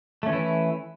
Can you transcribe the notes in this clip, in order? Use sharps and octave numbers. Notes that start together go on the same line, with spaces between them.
E3 A3 C#4 E4